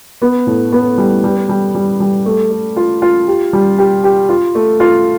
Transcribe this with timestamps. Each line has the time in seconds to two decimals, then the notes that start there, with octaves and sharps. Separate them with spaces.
0.22 B3
0.47 A2
0.72 B3
0.98 G3
1.24 G3
1.49 G3
1.75 G3
2.00 G3
2.25 A3
2.51 A3
2.76 F4
3.02 F4
3.28 G4
3.53 G3
3.78 G4
4.04 G4
4.29 F4
4.55 A3
4.80 F4